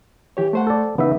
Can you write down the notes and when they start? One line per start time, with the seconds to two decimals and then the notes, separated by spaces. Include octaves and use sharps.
0.37 E3 G4 C#5
0.53 A3 C5 F#5
0.67 A4 D5
0.98 C#3 E3 B3 D#4 E5